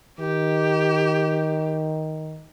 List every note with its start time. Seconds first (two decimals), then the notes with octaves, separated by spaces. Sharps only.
0.19 D#3 G4